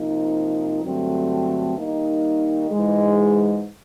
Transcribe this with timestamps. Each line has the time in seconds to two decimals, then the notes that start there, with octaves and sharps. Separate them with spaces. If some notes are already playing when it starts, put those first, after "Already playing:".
Already playing: C3 F3 A#3 D#4
0.83 G2 D3 F#3 A3 C4
1.77 D#3 G3 A#3 D#4
2.71 G#2 E3 G#3